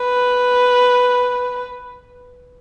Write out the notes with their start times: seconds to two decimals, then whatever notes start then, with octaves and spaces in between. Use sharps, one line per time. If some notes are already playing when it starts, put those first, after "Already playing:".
Already playing: B4